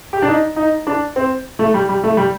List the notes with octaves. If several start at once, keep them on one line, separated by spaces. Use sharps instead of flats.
G4
D4
D#4
D#4
D4
C4
A3
G3
G3
A3
G3